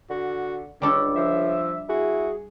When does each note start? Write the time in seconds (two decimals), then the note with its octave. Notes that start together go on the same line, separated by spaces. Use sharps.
0.10 D3 F#4
0.82 C#2 G3 C#4 D4 A4
1.16 F3 E5
1.89 E4 F#4 G#4